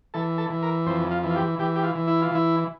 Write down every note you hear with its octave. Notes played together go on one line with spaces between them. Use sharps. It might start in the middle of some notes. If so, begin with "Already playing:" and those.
E3 A4
A4
E3
A#4
F2 C5
F4
E3
F4
G4
E3 G4
G4
F4
E3
E4
F4
E3 E4